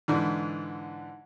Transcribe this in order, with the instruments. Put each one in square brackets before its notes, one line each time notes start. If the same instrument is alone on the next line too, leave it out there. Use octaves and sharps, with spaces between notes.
[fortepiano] G#2 D3 E3